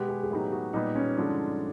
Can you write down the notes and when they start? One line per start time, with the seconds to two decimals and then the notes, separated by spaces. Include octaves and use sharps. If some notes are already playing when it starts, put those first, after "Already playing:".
Already playing: B2 G#3 B3 G4
0.08 G#4
0.23 G#4
0.31 A2 F#3 B3 D#4 G4
0.52 F#4
0.73 A#2 G3 B3 D#4
0.95 C#4
1.17 G2 D3 F3 G#3 C#4 D4